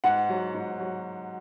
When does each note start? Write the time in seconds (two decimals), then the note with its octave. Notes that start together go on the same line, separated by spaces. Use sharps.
0.04 G#2 F#5
0.29 F#3
0.54 G#2
0.80 F#3